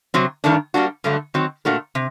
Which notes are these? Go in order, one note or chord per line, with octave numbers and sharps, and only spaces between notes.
C3 F#3 C4
G2 D#3 A3 D4
G3 A#3 D4 F#4
G2 D3 F#3 A3
D#3 F#3 C4 F#4
A#2 A3 D4 F#4 A#4
C3